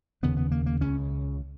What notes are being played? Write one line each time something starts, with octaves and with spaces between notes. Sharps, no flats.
F1 D#2 C#3 B3
B3
A#3
A#3
C#2 C#3 C#4